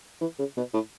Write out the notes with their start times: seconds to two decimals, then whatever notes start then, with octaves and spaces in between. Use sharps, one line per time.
0.21 E3
0.39 C#3
0.57 B2
0.74 A2